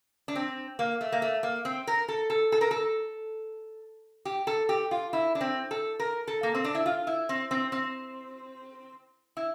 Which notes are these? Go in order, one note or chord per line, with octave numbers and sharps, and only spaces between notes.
D4
C4
A#3
A3
A#3
A3
A#3
C4
A#4
A4
A4
A4
A#4
A4
G4
A4
G4
F4
E4
D4
C4
A4
A#4
A4
A#3
C4
D4
E4
F4
E4
C4
C4
C4
E4